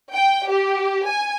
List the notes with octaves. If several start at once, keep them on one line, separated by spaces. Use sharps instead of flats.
G5
G4
G#5